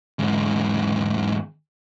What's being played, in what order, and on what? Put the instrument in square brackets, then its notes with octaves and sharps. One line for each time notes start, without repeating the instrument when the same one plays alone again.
[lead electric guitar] E2 G#2